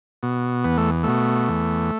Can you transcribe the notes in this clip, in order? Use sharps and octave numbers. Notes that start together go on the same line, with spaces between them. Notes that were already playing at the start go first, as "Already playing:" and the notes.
B2
E2 B3
A3
B2 A3
E2